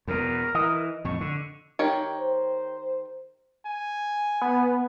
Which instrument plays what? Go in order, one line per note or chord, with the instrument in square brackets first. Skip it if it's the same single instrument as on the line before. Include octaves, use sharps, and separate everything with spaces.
[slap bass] E2 B2 [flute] A#4
[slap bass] E3 [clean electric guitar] D#5
[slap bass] F2 A2 [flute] C#6
[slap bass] D3
[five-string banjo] D#3 G4 C#5
[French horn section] C5
[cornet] G#5
[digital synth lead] B3